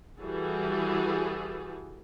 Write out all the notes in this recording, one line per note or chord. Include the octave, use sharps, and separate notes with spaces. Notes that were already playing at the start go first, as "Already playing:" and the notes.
E3 G3 F#4 G#4 A4